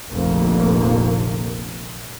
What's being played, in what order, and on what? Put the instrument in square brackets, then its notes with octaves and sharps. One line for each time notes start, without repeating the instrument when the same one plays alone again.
[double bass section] F1 A#1 F2 D3 A#3